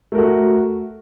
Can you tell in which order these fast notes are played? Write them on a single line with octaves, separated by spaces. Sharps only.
A3 A#4 F#4